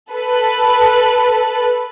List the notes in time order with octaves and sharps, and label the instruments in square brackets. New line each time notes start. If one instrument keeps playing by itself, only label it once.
[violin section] A4 B4